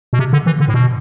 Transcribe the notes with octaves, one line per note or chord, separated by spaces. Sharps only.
B2
C3
D3
E3
D3
A2
B2